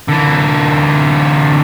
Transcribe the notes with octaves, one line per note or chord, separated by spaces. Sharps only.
D3 E3